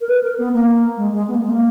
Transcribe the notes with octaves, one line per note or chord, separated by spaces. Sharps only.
A#4
B4
A#4
B3
A#3
G#3
G#3
B3
A#3
G#3
A#3